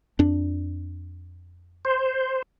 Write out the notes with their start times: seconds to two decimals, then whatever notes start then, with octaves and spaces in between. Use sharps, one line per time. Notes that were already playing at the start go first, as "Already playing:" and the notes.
0.19 F2 D4
1.85 C5